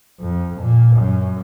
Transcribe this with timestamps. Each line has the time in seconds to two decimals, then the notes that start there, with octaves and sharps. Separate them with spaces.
0.20 F2
0.61 A#2
0.96 F#2